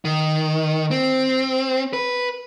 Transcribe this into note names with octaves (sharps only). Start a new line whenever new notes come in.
D#3
C4
B4